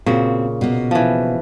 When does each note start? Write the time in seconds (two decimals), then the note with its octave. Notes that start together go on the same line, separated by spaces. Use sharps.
0.06 A#2 C#3 C4 F#4
0.61 B2 A#3
0.91 E3 F3